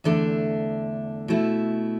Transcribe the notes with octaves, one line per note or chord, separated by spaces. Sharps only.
E2 D3 A3 D4
B2 A3 E4